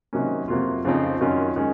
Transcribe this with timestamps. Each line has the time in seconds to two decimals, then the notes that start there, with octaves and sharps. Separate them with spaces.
0.13 C3 D#3 F#3 A#3 C#4
0.48 F2 C3 F#3 A#3 F4
0.84 F2 C#3 F3 C4 D#4
1.21 F#2 D#3 F#3 C#4 F4
1.56 D#3 G#3 C#4